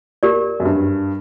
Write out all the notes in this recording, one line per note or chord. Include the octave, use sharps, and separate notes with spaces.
G4 A#4 D5
F#2
G2